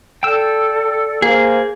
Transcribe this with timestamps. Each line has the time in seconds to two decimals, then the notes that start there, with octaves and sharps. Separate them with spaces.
0.23 A4 D5 G5 E6
1.22 A#3 G#4 C5